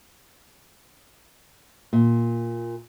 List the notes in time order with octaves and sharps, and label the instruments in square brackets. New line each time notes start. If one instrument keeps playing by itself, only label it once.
[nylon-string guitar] A#2